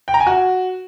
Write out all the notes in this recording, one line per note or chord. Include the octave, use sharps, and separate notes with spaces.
G5
A#5
G#5
F#4